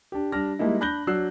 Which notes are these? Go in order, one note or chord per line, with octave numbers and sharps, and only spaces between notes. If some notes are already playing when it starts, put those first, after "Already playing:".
D4 G4
G3 D4 F6 A#6
G3 G#3 A#3 D#4 E4
D4 B5 F#6 G6 A#6 G7
F#3 D4 D5 E6 F#6 C7